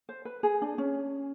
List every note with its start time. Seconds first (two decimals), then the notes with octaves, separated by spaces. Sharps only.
0.09 C5
0.25 B4
0.43 G#4
0.62 D4
0.78 C#4